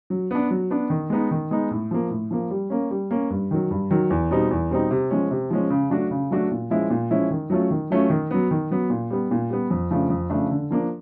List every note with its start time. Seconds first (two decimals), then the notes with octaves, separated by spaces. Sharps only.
0.10 F#3
0.31 B3 D4
0.51 F#3
0.71 B3 D4
0.90 D#3
1.10 G#3 B3 D#4
1.31 D#3
1.51 G#3 B3 D#4
1.71 A2
1.91 F3 A#3
2.10 A2
2.31 F3 A#3
2.50 G3
2.70 A#3 C#4
2.90 G3
3.11 A#3 C#4
3.30 G2
3.51 D#3 F#3
3.71 G2
3.91 D#3 F#3
4.10 E2
4.31 B2 G3 C4 D#4
4.51 E2
4.71 B2 G3 C4 D#4
4.91 C3
5.10 F3 G#3 C#4
5.31 C3
5.50 F3 G#3 C#4
5.70 C#3
5.90 F#3 A3 D4 F#4
6.11 C#3
6.31 F#3 A3 D4 F#4
6.51 A#2
6.70 F3 G#3 C#4 E4
6.90 A#2
7.11 F3 G#3 C#4 E4
7.31 D#3
7.50 F#3 A3 C#4 F4
7.71 D#3
7.90 F#3 A3 C#4 F4
8.10 D#3
8.31 F#3 B3
8.51 D#3
8.71 F#3 B3
8.90 A#2
9.10 G3 B3
9.31 A#2
9.50 G3 B3
9.70 F2
9.91 C#3 F3 A3 D4
10.10 F2
10.30 C#3 F3 A3 D4
10.51 D3
10.71 F3 A#3 D4